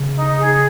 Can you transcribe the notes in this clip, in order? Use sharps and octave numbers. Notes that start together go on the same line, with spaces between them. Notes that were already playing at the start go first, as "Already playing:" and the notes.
Already playing: C#3
D#4
G#4